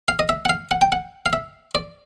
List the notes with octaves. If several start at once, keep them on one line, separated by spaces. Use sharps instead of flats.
F5
D#5
E5
F#5
F5
F#5
G5
F#5
F5
E5
D5